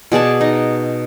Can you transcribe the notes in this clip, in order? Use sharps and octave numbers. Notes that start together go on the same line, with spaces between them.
B2 G#4 D5 A5
D#4